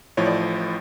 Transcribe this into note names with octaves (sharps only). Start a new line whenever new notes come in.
A1 A2 F3 C#5
D5